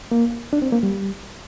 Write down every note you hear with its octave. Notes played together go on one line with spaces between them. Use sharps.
A#3
D4
C4
A#3
G3